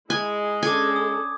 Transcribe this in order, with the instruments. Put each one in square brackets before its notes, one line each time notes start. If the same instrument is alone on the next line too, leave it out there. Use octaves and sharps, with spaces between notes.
[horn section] G#3 [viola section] E4 [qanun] G#5
[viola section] C#4 D4 A4 [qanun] G#5 [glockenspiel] D6 G#6
[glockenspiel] D#6